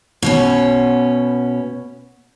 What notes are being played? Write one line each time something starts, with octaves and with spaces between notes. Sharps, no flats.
B2 B3 C#4